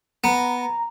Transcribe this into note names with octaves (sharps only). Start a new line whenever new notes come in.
B3 A#5